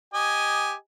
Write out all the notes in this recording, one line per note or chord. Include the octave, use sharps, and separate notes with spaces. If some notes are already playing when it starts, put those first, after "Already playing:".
G4 D#5 G#5